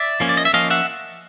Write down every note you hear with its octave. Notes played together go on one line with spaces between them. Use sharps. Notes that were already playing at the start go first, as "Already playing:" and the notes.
Already playing: D5 E5
F3 A#3 C#4
D5
D#5
E5
F3 A#3 C#4 D#5 F5
E5 F#5